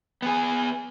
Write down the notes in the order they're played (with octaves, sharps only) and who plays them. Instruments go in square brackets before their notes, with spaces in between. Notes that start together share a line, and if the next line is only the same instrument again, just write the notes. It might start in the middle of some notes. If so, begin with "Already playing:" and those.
[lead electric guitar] B3 G#4